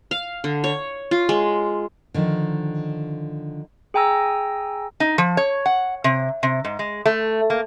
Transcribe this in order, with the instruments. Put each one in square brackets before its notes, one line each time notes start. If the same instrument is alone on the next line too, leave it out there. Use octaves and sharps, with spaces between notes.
[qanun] F5
D3
C#5
F4
G#3
[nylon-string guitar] D3 D#3 F3
[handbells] G#4 G5 G#5 A#5 E6 A#6
[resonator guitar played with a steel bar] D#4
F3
C#5
F#5
C3
C3
G#2
G#3
A3
A#3